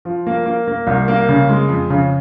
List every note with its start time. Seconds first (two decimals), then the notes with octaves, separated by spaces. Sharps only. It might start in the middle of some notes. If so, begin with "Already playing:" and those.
0.05 F3
0.27 A#3
0.46 A#3
0.67 A#3
0.87 C2
1.08 A#3
1.29 C#3
1.49 G#3
1.69 F2
1.90 C#3